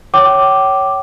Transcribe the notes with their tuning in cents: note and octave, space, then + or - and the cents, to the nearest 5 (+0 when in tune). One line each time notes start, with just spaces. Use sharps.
C#5 +0 G5 -35 D6 +0